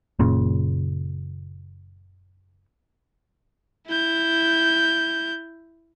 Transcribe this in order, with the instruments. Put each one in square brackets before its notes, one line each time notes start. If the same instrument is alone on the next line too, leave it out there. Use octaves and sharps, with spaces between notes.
[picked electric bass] F#1 A#2 C#3
[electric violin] E4 G6